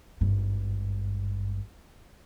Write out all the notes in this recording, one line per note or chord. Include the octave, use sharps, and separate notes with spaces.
G#1 G2